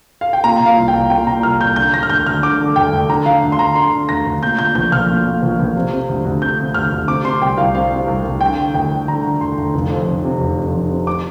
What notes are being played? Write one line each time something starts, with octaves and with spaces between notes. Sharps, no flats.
F5
G5
A#2 A#5
A#2
F5
C2
G5
C2
A#2 G5
A#2 A#5
C2 F6
C2 G6
D3 G6
D3 A#6
F6
D2 G6
D2 F6
D3 D6
D3
D2 G5
D2
D3 A#5
D3 F5
D2
C6
D2 A#5
D3 C6
D3
D2 A#6
D2
A#2 G6
A#2 G6
A#1 G6
A#1 F6
A#2
A#2
A#1
A#1
C3
C3
D2
D2
C3 G6
C3
D2 F6
D2
C3 D6
C3 C6
C2 G5
C2 F5
C3 F5
C3
C2
C2
D3 G5
D3
D2 G5
D2
D3 A#5
D3
D2 C6
D2
F1
F2
F1
C3
F1
F2
F1
C3
D6